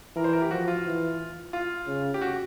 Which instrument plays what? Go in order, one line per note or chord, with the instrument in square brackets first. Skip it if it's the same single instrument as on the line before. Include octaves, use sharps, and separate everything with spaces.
[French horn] E3 [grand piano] A#4
[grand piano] C5
A#4
G4
[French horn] F3 [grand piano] F#4
[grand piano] F4
[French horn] E3
[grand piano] F4
[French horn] C#3
[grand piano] G4
F#4